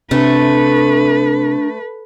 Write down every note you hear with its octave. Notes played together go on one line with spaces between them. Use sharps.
C3 A3 D4 B4